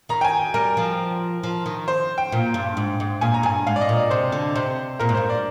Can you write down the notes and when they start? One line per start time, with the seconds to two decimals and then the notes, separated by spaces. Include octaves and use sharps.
0.09 D#3 A#5
0.21 G5
0.25 G#5
0.54 G3 A#4
0.77 F3
1.43 F3
1.66 D#3
1.88 C5
2.18 G5
2.32 A#2
2.54 G2
2.77 G#2
3.00 G#2
3.21 A#2 G#5
3.34 A#5
3.43 G2 G#5
3.67 G#2 F5
3.76 D5
3.81 D#5
3.89 A#2
3.96 D5
4.10 C3 C5
4.32 D3
4.56 C3 C5
4.99 A#2 A#4
5.09 G#2
5.15 G2 C5
5.30 D5